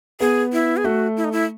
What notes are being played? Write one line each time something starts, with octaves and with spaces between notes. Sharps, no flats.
B3 G#4
E4
G#4
A3 F#4
E4
D#4
E4